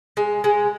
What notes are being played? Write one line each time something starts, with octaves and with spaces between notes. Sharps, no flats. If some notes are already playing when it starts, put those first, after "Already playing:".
G#3
G#3